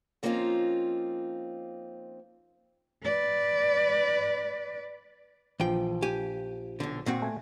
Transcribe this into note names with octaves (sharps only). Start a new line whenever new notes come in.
F3 A#3 C4 C#4 D#4 F4
B4 D5
A#1 E3 F3 G5
G4 G#5
B1 D3
A#2 C4 F#4
A3 G#5